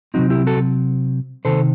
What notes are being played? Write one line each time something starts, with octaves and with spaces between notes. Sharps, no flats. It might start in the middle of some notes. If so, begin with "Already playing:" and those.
C3 F#3 C4 D#4 F#4
E4 G4
F#4 A4
C3 D#3 A4 C5